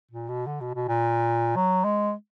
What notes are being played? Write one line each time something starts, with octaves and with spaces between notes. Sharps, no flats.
A#2
B2
D3
B2
B2
A#2
F#3
G#3